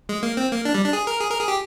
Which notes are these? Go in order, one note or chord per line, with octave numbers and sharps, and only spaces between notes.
G#3
A#3
C4
A#3
D4
G3
D4
G#4
A#4
G#4
A#4
G#4
G4